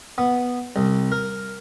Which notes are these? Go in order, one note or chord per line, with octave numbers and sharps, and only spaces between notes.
B3
C2
A#4